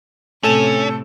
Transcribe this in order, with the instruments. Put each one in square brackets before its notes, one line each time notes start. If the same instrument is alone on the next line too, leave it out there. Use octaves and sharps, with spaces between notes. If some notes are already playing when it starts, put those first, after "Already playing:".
[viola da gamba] A2 C3 [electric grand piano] A3 A4 E7 [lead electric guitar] C#4